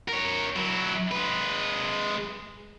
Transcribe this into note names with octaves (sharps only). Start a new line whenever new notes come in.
A#4 C#5
F#3 E4
G#3 B4